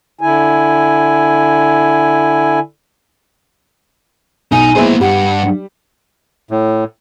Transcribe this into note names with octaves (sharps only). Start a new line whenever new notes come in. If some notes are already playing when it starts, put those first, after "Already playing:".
D3 E4 G#5
B1 D#4 G#5
G#3 A#3 B3 E4 C5
G2 G3 F#5
A2